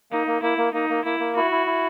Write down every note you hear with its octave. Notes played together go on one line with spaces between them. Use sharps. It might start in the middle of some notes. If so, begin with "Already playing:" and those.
A#3 D#4
A#3
A#3 E4
A#3
A#3 D#4
A#3
A#3 E4
A#3
E4 F#4
E4
E4